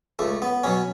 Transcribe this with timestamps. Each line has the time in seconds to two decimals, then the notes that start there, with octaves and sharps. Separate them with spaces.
0.19 C#2 A3
0.42 B3
0.64 B2 F#3 C#4